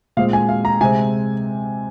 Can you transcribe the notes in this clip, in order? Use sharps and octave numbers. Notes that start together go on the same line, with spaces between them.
A#2 G#3 C4 F5
G#5
F5
A#5
C3 G#3 C4 G#5